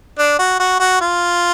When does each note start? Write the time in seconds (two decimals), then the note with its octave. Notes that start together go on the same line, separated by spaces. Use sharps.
0.19 D4
0.39 F#4
0.59 F#4
0.80 F#4
1.01 F4